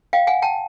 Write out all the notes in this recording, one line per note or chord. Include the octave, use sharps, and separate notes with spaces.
F5 G5
F#5 G#5
G5 A5